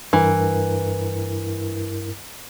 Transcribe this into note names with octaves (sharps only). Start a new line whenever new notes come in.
G2 E3 E4 A#4